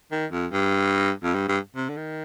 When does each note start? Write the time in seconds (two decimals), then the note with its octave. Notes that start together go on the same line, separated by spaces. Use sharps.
0.12 D#3
0.32 F2
0.53 G2
1.23 F2
1.34 G2
1.49 G2
1.76 C3
1.89 D3
1.97 D#3